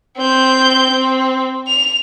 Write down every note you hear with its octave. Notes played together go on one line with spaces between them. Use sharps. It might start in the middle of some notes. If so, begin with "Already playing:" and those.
C4 G6
C4
F7